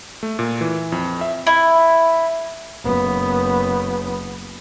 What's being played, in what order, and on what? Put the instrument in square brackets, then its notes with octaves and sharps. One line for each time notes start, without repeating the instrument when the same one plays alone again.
[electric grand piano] A3
A#2
E3
F2
E5
[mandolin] E4
[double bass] F#1 B3